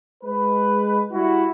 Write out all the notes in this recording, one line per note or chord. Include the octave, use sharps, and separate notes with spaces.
G#3 B4
G3 E4 F#4